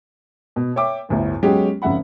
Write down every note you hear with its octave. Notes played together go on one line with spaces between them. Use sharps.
B2
C#5 E5 G5 D6
G1 D2 A2
F#3 G#3 B3 C#4 G4
G#1 F2 C#3 E5 F#5 B5